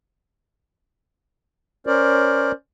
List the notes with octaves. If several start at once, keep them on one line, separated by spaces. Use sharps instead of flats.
C#4 A#4 C5 D5